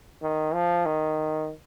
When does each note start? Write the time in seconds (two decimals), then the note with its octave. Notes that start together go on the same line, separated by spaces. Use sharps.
0.22 D#3
0.54 F3
0.86 D#3